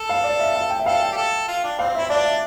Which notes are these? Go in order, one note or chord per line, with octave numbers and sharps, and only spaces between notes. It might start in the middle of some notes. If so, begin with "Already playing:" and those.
Already playing: A4
F5
D5
E5
F5
G5
E5
A4 F5
G5
G4
A4
F4
D4
C4 F5
E5
E4
D4 D5
E5